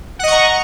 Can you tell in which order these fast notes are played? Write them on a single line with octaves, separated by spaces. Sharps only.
F#5 D#5 C#6 A#5